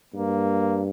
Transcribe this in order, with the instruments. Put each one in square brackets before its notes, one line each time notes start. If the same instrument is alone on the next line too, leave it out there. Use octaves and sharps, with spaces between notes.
[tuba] G2 [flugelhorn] A#3